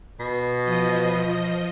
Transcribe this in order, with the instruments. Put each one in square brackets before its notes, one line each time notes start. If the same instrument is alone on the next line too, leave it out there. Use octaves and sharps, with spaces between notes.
[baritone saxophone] B2
[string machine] F3 D#5